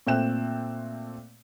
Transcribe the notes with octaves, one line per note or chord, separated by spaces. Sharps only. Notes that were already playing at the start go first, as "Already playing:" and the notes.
A#2 A3 C4 G5 F#6 E7